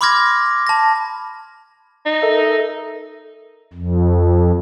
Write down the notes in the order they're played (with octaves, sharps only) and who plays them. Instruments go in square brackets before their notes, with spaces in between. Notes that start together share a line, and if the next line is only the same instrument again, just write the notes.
[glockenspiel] B5 C6 D6 F6 G#6 A#6
A5 A#6
[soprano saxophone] D#4
[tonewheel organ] A4 A#4 E5
[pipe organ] F2